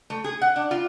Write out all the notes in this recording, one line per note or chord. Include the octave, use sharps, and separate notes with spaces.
A3
G#4
F#5
D4
F4